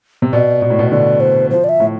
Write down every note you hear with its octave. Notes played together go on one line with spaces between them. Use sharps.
C3
B2 D5
B2
A2
B2
D3 D5
C5
F3 C5
D5
E5
A2